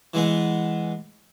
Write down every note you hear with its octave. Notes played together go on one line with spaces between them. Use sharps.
E3 G#3 B3